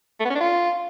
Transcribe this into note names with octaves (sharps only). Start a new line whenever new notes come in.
A3
B3
C#4
D4
F4